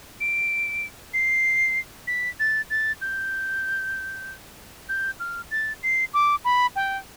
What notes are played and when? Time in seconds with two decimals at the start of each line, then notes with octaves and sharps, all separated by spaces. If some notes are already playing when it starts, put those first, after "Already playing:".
0.20 D7
1.14 C7
2.07 B6
2.40 A6
2.70 A6
3.01 G6
4.89 G6
5.20 F6
5.51 A6
5.83 C7
6.14 D6
6.45 B5
6.76 G5